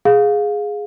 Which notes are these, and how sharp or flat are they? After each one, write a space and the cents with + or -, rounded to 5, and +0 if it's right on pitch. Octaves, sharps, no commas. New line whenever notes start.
G#4 +0 F5 +20